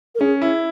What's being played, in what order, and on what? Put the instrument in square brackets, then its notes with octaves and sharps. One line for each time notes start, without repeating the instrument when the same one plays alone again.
[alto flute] A#4
[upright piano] C#4 [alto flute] G#4
[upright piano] E4